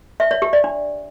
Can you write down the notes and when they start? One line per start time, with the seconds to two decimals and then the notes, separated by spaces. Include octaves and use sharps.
0.20 E5
0.31 C#5
0.42 G4
0.53 D5
0.64 D4